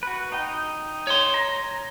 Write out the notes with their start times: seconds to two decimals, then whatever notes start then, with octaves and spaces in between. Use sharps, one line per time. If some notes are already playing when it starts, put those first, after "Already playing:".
0.03 F#4 B4
0.32 D#4 G5
1.07 C#5 C6
1.34 A#5